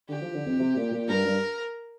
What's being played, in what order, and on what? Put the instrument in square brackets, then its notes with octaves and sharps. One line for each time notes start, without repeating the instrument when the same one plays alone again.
[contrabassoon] D3 [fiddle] G4
[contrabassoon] F3
D3
F2
C3
A#2
A#2
[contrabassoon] G2 [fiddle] A#4
[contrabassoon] G2